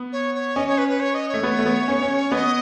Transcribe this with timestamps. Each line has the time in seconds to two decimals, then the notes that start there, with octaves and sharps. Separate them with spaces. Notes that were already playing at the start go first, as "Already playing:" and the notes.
Already playing: B3
0.12 C#5
0.35 C#5
0.56 C#4 D#5
0.67 C#5
0.78 B4
0.89 B4
1.00 C#5
1.14 D#5
1.29 C#5
1.34 A3
1.43 B3
1.59 A3
1.66 B3
1.88 C#4
2.02 C#4
2.31 B3 D#5